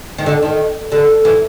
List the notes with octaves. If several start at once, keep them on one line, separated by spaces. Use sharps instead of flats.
D#3
D3
D#3
D3
E3